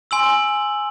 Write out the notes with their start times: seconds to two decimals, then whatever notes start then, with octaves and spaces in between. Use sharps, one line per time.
0.11 G#5 C6 E6 F#7